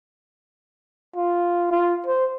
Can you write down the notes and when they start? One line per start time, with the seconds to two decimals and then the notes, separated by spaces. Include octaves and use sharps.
1.16 F4
1.71 F4
2.07 C5